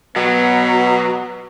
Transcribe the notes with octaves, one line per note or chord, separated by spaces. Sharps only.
B2 F#3 B3